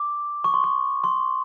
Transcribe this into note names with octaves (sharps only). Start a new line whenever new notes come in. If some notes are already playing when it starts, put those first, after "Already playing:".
Already playing: D6
C#6
C6
C#6
C6